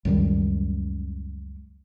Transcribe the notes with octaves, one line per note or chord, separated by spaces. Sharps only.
C#2 F#2 D#3 G3